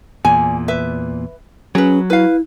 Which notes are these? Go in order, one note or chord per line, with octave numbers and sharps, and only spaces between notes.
E2 A#2 G#5
B4 E5
F#3 C#4 G#4 B4
E4 B4 F5